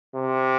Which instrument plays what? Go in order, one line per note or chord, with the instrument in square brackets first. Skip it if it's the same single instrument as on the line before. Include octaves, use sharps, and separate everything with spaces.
[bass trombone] C3